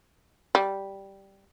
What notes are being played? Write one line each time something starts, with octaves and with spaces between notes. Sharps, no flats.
G3